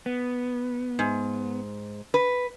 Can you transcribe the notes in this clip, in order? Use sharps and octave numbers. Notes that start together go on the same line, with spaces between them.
B3
G#2
B4